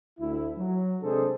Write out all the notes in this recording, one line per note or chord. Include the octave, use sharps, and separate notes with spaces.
D2 E4
F#3
C3 G#3 D4 G#4 A4 C5